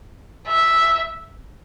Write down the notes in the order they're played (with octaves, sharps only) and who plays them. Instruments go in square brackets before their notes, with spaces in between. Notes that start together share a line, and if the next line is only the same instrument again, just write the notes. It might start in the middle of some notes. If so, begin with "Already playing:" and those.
[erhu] E5